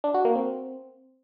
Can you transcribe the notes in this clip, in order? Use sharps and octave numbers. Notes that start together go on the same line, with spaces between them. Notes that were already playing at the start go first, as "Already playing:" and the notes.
D4
F#4
A#3
C4